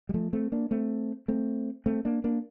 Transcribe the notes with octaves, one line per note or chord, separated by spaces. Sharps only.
G3
F3 A3
A3 C4
A#3 D4
A3 C4
A3 C4
A3 C4
A#3 D4
A#3 D4